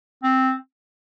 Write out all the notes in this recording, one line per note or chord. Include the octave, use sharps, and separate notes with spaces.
C4